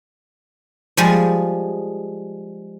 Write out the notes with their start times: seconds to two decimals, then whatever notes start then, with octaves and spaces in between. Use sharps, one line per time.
0.97 F3 G3 G#3